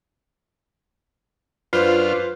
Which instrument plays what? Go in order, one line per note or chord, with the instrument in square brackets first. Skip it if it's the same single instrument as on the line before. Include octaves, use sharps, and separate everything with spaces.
[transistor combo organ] F#2 D4 F6 [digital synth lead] F4 [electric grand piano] B4 C5